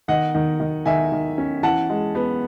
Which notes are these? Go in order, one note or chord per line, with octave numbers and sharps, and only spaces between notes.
D#3 D#5 F#5
D#3
D#3
D#3 E5 G#5
D#3
C#4
E3 F#5 A5
G#3
B3